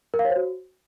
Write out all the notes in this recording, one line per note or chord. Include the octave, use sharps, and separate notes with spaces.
A#4
F5
C#5
C5
F#4